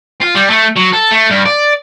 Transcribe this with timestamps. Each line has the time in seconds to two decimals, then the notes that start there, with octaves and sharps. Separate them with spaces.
0.21 F4
0.35 G3
0.50 A3
0.77 F#3
0.93 A4
1.12 A3
1.30 G2
1.46 D5